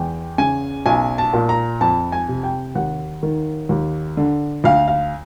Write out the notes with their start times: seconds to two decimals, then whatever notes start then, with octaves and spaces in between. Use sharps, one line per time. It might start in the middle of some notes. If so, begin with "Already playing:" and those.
Already playing: E2 G5
0.38 C#3 G#5
0.86 B1 G#5
1.18 A5
1.33 A#2
1.49 A#5
1.81 F2 A5
2.12 G#5
2.28 C3
2.43 G5
2.75 D#2 F#5
3.23 D#3
3.69 D#2
4.17 D3
4.64 D2 F5
4.88 F5